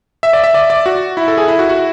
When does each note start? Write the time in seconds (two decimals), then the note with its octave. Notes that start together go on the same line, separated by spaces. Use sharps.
0.23 E5
0.33 D5
0.44 E5
0.54 D5
0.70 D5
0.86 F#4
1.17 E4
1.28 A4
1.37 G#4
1.48 E4
1.59 F#4
1.69 F#4